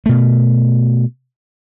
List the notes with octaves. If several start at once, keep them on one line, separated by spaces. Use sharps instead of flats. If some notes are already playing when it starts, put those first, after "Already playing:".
B2 A3